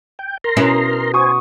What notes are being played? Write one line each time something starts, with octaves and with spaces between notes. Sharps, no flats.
G5
A#4 A#5 C6
B2 C#4 E4
F#4 C5 G#5 C#6 D#6